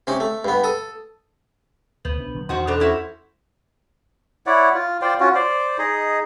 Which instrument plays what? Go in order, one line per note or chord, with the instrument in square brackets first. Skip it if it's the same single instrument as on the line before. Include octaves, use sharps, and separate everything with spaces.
[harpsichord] C3 C#4 D#4
A3
G2 B3
A4 D#6
[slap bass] D2 [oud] B3 [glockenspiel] G6 F#7
[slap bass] B1 D4
D3 F#3
[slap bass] E2 [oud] D#3 [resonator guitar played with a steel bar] D#4 F#4 C5 [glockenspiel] C6 G6
[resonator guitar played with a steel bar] B2 D4 [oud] A4 C5 [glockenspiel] D6 F7
[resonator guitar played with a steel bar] C#4 E4 F#4
[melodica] E4 C#5 D5 F#5
F4
F4 C5 D5 G5
C#4 F4 F#4
C5 D5
D#4 G#4 D#5